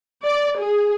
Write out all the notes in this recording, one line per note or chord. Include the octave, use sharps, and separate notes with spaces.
D5
G#4